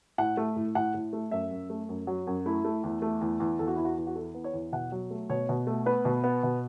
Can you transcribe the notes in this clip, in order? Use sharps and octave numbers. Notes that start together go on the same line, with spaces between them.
A2 F#5
A3
A2
A2 F#5
A2
A3
F#2 E5
F#2
A3
F#2
F#3
F#2
A3 E4
A3
E2
A3
E2
E2
E2 A4
F#4
E2 E4
F#4
E2
F#4
E3 A4
B3
C#5
E2
B2 F#5
F#3
A3
B2 C#5
B2
A3
B3 B4
B2
B3
B2